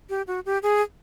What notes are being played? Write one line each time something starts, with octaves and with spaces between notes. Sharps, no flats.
G4
F#4
G4
G#4